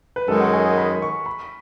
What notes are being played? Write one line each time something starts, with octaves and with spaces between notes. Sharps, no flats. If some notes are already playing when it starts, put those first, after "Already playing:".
B4
F#2 D#3 G#3 A4
F#5
G#5
B5
C#6
B5